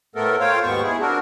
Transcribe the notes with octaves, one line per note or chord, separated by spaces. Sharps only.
A2 A3 B3 A4 A#4
F4 C5 C#5 F5 G5
D#2 G#2 B2 B3 C5 C#6
E4 G#4
C4 D4 F#4 A#4